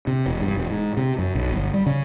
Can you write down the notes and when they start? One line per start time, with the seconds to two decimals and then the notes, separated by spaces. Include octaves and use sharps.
0.07 C3
0.26 E1
0.41 G2
0.55 E1
0.70 G#2
0.97 C3
1.19 F#2
1.35 B1
1.52 G1
1.74 G3
1.86 C#3